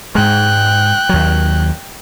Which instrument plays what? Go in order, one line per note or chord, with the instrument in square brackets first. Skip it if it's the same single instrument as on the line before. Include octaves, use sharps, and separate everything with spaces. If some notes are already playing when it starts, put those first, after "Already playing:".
[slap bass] G#2 G#3 [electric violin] G5 F#6
[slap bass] D#2 F#3